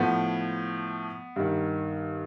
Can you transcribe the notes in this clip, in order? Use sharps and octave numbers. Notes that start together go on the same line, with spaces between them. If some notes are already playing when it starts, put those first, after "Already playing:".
Already playing: A2 F3 B3
G2 D#3